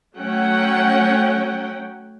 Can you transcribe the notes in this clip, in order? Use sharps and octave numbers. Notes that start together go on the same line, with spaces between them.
F#3 A3 C#4 F#5 G5